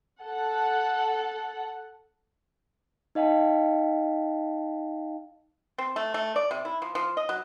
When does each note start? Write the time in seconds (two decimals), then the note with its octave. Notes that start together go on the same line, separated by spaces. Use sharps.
0.21 A4 F#5
3.15 D#4 D#5 F5 G5 A5
5.78 C4
5.96 A3
6.14 A3
6.36 D5
6.51 C3
6.65 E4
6.82 F3
6.95 F3
7.17 D#5
7.29 F#3